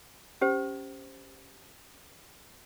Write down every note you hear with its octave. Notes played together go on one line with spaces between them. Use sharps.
C#4 G4 C5